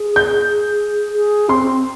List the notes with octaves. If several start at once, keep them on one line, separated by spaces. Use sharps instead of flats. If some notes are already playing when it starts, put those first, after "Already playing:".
Already playing: G#4
G6
G#4
C4 C6